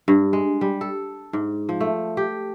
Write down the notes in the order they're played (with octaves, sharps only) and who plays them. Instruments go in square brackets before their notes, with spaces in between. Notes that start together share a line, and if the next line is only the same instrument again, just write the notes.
[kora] G2
G#3
G3
A4
G#2
F3
A3
G4